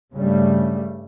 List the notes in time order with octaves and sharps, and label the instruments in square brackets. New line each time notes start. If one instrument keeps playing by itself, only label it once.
[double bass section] G2 C#3 G3 A3